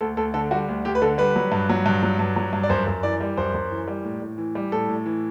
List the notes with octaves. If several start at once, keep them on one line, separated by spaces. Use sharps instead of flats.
D2 A4
D2 A4
D3 A4
G3 F#4
D2
D2 G4
B4
D3 A4
G3 B4
F#3
G2
F#3
G2
F#3
G2
F#3
G2
D5
F#2 C5
F#2
E3 D5
G3
F#2 C5
F#2
E3
G3
A2
A2
E3
G3
A2 A4
A2
E3